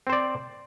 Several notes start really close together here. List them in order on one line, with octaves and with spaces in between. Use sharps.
C4 C5 D5